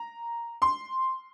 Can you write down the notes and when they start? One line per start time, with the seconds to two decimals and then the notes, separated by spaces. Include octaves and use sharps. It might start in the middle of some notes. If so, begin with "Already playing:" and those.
Already playing: A#5
0.62 C6